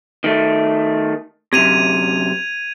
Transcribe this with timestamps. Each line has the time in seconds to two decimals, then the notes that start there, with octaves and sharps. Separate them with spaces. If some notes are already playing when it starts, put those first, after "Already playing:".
0.24 D#3 A3
1.53 F#2 C3 G#6 D#7 F7